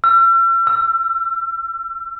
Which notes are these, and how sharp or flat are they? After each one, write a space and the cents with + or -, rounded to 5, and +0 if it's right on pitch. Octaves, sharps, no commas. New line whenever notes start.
E6 +45
E6 +20